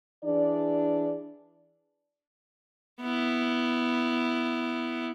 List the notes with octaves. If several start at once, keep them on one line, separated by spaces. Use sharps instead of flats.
E3 D4 G#4 D5
B3 E4